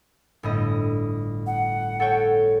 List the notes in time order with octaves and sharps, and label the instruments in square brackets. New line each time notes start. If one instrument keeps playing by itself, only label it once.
[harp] G1 A2 D#5
[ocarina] F#5
[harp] A4 C#5 G5